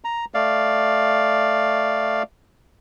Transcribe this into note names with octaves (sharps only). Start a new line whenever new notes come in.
A#5
A3 D5 F5